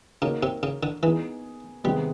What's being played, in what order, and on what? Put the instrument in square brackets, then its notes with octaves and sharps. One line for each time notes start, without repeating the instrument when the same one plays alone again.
[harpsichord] C#3 [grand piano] A#3 D#4 F#4 A#4 C#5
[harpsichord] C3
C#3
D3
[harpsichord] E3 [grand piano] B3 D#4 G#4
[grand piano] C3 D#3 G#3 B3 [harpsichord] G3